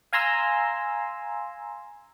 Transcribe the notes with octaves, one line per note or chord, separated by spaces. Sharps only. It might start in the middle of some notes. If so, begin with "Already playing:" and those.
F5 G#5 A#5 C6 E6